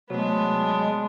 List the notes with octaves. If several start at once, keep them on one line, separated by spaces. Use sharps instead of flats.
C3 F#3 G#3 A3 B3 D4